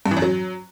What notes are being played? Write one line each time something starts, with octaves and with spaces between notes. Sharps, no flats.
G2
E3
F#2
F#3